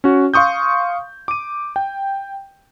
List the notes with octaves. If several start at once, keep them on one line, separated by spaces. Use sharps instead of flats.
C#4 F#4
F5 C6 C#6 D#6 G6
D6 D#7
G5